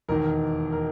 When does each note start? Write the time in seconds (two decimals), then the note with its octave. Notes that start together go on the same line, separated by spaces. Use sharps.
0.08 E1 D#2 D#3 A#4
0.72 A#4